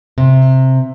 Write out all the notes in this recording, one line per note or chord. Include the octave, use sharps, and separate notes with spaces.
C3